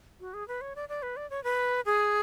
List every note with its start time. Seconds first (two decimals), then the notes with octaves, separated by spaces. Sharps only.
0.20 F#4
0.34 G#4
0.48 B4
0.61 C#5
0.76 D5
0.89 D5
1.03 B4
1.17 D5
1.30 C#5
1.44 B4
1.86 G#4